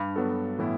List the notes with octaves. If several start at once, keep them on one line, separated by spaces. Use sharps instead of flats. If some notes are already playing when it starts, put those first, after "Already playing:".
Already playing: G2
F#3 B3 F#4 A4
A2 E3 B3 E4